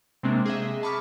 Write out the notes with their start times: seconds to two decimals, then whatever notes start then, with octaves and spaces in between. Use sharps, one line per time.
0.23 C3 F#3 G#3 A#3 C4 D4
0.46 G#4 D#5 E5
0.83 A5 B5 C#6 D6 F6 B6